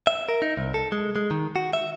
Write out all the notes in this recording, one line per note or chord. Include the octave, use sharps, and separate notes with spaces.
E5
A#4
D#4
C2
A4
G#3
G#3
D#3
F#4
E5